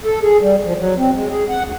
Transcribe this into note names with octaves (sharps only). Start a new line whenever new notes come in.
A4
G#4
G3
F3
F#3
C4
G#3
G#4
F#5
D2